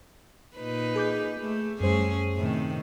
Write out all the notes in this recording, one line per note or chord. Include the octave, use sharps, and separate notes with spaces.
A#2 D#4 B4
G#4 D6 G6
A3
F#2 G3 A3 C#4 G#4 C5
A2 C3 D#3